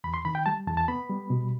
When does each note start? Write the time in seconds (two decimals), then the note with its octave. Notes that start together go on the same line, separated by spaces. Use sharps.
0.04 E2 B5
0.14 C6
0.25 D#3 B5
0.35 G5
0.46 G3 A5
0.67 E2 A5
0.77 A5
0.88 B3 B5
1.10 G3
1.30 B2